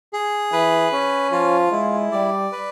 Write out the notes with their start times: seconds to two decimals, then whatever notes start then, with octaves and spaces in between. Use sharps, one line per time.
0.13 G#4
0.52 E3 B4
0.92 C#4
1.32 F3 F4
1.72 G#3 E4
2.12 G3 D5
2.52 B4